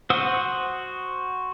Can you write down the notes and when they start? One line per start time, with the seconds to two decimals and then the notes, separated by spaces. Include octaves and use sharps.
0.10 F#4 C5 F#5 D#6 E6